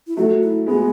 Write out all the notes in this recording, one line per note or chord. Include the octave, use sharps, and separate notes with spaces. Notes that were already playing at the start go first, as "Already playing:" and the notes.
E4
F#3 A3 F#4
E4
G#3 B3 F#4